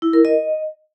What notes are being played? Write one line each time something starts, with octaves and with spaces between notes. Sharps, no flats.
E4
A#4
D#5